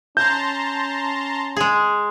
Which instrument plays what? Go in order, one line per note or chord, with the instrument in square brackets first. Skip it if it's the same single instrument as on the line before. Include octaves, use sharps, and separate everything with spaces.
[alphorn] C#4 [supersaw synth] A5 A#5 C6 [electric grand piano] G6
[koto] G#3 G#4